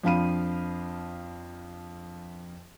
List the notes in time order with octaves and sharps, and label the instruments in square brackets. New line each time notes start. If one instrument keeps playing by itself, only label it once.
[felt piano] F2 F3 D4 F5 B5 D#7